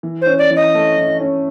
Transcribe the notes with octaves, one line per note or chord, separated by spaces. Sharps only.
E3
C#4 C5
D5
E3
D#5
A3
E3
C#4